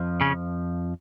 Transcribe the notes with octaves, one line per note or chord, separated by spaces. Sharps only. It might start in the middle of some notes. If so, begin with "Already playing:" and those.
Already playing: F2 F3
C#3 C#4